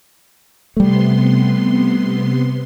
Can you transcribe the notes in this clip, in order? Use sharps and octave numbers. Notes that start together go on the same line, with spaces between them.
C3 G3 A3 B3 C6